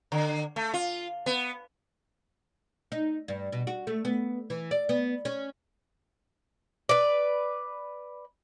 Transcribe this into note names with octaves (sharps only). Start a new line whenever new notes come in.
D3
A3
F4
B3
D#4
G2
B2
F#4
A3
B3
E3
D5
B3
C#4
B4 D5